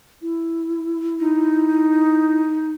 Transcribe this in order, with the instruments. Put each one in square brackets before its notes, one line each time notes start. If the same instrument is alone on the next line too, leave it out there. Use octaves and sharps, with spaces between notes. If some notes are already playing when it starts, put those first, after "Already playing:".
[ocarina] E4
[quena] D#4